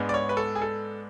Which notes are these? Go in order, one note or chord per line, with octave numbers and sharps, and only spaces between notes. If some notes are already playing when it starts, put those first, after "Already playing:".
Already playing: G#2 G#3 B3 D4
D5
C#5
B4
A4
G#4
A4